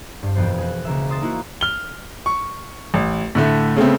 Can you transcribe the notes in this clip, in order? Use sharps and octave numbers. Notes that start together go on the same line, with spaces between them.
G2 C5
E1 F2 F3 B3 C5
G#4 F#6
C#2 A#3 E5
E5 C6 D#6 E6 A6 E7
A#3 D#4 E4 F#4 A#4
F6 G7
C#6
A1
A2 D3 A3
C#3 A3 B3 C4